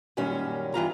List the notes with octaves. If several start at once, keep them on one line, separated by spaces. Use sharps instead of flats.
F#2 A#2 D#3 G3 C#4
G2 E3 F4 A#5